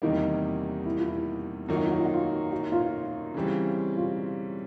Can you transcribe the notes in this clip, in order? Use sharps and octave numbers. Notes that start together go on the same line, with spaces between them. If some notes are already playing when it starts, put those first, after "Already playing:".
E2 C3 D#3 G3 A#3 D#4
E4
F4
E4
F#2 D#3 F#3 A#3 D#4 F4
F#4
F4
F#4
F4
F#4
F4
F#4
F4
C#3 E3 G3 C4
F4